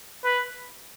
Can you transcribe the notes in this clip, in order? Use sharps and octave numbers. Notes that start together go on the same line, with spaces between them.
B4